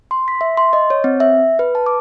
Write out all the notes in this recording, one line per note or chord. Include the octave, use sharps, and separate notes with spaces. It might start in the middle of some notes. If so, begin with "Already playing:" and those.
C6
B6
E5
C6
D#5
C#5
C4
E5
B4
A5
D6